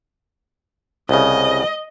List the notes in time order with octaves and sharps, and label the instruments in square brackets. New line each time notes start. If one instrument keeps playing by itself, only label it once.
[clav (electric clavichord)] C2 C#3 [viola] D#5